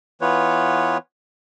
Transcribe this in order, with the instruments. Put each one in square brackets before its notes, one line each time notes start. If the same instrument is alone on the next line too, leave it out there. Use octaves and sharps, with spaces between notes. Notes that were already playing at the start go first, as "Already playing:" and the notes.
[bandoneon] E3 B3 F4 B4 C#5